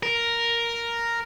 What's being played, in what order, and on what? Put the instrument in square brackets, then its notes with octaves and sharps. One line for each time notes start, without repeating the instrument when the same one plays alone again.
[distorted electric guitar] A#4